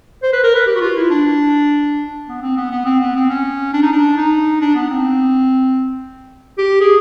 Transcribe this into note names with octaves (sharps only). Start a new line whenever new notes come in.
C5
B4
A#4
B4
G4
F#4
F4
E4
D4
B3
C4
B3
B3
C4
B3
C4
C#4
D4
D#4
D4
D#4
D4
B3
C4
G4
G#4